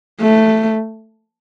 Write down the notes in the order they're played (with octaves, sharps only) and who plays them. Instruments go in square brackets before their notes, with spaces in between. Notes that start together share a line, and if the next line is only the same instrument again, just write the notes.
[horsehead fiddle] A3